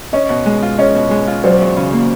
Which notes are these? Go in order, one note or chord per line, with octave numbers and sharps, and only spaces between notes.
C#4 C#5 D#5
B2
G#3
F4
C#4 C#5 D#5
B2
G#3
F4
F#3 C5 D5
E2
C#3
A#3